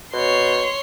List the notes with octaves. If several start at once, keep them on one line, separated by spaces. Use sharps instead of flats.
B2 C#5 C6